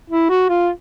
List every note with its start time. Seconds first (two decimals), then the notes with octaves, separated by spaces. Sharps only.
0.10 E4
0.30 F#4
0.49 F4